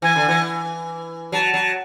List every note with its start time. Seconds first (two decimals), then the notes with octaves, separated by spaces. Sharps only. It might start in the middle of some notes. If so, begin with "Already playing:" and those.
0.02 E3 G#5
0.16 D3
0.28 E3
1.32 F#3 A5
1.54 F#3